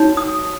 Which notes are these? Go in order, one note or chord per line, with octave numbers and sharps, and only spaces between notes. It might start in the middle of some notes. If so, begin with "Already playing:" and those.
Already playing: D#4 F#4 C#5
D#6